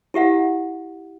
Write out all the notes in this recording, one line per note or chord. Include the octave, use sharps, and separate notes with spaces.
E4 G4 E5 F#5